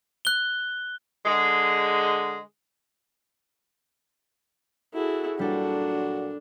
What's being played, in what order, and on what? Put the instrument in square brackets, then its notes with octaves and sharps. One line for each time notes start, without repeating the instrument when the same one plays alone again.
[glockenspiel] F#6 G7
[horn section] D3 G#3
[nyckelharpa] E4 G#4 [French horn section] F#4 A4
[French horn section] A#2 F#3 F#4 [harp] G3 A4 [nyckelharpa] D4